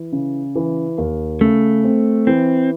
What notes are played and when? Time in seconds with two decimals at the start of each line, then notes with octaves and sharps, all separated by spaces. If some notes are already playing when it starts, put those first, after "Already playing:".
Already playing: E3
0.12 C#3
0.55 E3
0.98 D#2
1.41 C#3 A3
1.84 C4
2.27 E3 C4